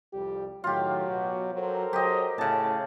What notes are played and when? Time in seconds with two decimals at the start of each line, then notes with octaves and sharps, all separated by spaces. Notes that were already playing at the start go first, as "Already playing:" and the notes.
0.13 C2 F2 G3 G4
0.64 A2 D#3 F#3 F4 G4
1.07 B2 F#4
1.54 F#3 A4 A#4 C5
1.93 F#3 G4 D#5
2.38 A2 C#3 A5